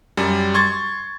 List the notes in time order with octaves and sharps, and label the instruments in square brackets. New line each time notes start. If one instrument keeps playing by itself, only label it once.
[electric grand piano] F#2 G3
C6 C#6 G#6 A6